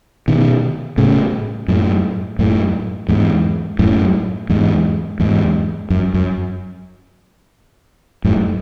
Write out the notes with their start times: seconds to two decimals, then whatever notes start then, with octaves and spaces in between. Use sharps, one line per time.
0.28 B2 D#3
0.98 A2 C#3
1.68 F#2 A2
2.39 F#2 A2
3.08 E2 G#2
3.79 F#2 A2
4.49 E2 G#2
5.20 E2 G#2
5.90 F#2
6.14 F#2
8.24 F#2 A2